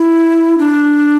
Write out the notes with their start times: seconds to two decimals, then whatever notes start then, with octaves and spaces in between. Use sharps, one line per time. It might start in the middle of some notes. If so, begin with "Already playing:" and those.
Already playing: E4
0.58 D4